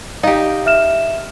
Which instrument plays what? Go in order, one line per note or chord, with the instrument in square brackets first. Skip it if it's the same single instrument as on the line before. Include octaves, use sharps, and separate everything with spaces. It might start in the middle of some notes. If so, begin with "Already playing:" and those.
[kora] D#4 G4 [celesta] F5
[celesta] E5 F6 E7